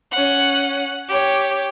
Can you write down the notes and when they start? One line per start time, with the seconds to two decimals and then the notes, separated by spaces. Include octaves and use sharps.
0.12 C#4 F#5
1.08 G4 C#5